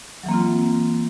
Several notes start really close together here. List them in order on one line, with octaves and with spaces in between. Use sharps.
F#3 E3 A#3 C4 F4